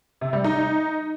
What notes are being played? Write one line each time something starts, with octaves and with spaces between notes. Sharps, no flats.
C3
G3
D#4